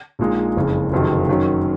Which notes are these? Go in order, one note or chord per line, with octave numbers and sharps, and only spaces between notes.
A#1 A#2 G#3 D#4
F#1 F2 C#3
F#1 F2 C3 D#3 F#3
F#2 D#3 F#3 C#4